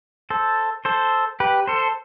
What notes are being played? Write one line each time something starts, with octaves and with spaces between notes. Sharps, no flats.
A4 C5
A4 C5
G4 B4
A4 C5